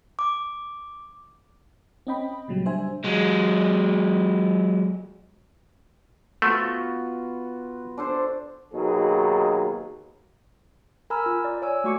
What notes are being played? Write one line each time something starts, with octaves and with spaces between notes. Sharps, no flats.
D6
C4 C#4 D#5 G5 B5
A#2 C#3 F#3 G3
G3 D4 C5 E5 G#5
F#3 G#3
A3 B3 F4 F#4
D4 A4 C5
D#2 B2 F#3 D#4 G#4
A#4 G#5 A#5 B5 E6 F6
F4
D5
C#5 D5 G#5 E6
A3 F#4 C#6 D6 C#7